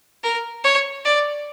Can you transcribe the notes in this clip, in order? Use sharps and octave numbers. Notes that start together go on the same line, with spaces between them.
A#4
C#5
D5